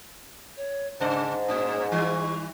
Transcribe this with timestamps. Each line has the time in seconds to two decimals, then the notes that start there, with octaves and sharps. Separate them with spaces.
0.57 C#5
1.00 G#2 C3 D5 A5
1.48 A2 C#4 D#6
1.92 D#3 G3 E4 C#6